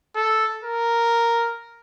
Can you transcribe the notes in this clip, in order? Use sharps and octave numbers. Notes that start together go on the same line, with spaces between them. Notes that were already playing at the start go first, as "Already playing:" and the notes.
A4
A#4